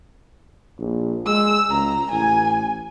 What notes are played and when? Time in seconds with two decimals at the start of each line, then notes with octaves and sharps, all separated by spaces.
0.80 A#1
1.26 G#3 E6
1.70 C#2 A#5
2.11 A1 G#5